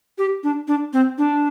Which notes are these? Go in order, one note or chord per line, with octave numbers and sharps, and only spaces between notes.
G4
D4
D4
C4
D4